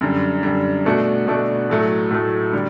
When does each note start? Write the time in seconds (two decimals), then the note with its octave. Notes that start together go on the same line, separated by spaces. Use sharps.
0.01 F#2 D3 G3
0.43 F#2 D3 G3
0.85 B2 A3 D4 F#4
1.27 B2 A3 D4 F#4
1.70 A2 F#3 A3
2.11 A2 F#3 A3
2.53 D3 G3